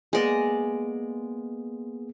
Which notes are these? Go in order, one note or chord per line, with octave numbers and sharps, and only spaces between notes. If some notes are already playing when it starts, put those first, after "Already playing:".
G#3 A#3 B3 G#4 D5 D#5